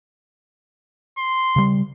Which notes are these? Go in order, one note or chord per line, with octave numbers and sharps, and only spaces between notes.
C6
C#3 G3